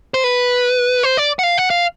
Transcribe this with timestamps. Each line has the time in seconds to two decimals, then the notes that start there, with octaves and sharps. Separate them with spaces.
0.14 C5
0.24 B4
1.03 C5
1.17 D5
1.39 F#5
1.43 F5
1.58 F#5
1.70 F5